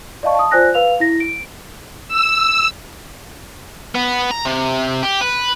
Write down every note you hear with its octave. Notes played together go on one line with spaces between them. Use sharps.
D5 D#5 F5 A5 C#6
A5 D#6
F4 C5 D5 G#5 F#6 A#6
B4 F5 F7
E4 A#6
D7
E6
B3
A#5
C3
G4
B4